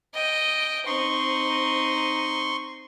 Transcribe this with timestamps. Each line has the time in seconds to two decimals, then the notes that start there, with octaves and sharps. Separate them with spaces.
0.14 D#5 G5
0.87 C4 D#4 C6 C#6